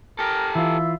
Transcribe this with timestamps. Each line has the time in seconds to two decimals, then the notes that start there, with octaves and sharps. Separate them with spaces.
0.19 G4 A4 A#4
0.55 E3 F4 E5